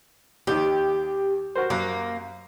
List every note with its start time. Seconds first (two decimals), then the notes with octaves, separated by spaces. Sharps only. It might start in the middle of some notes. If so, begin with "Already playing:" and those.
0.47 D#2 D#3 G4
1.55 F#4 A#4 C5
1.70 F#2 A#3 A#5 F#6